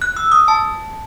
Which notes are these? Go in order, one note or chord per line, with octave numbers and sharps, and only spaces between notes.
F#6
E6
D#6
A5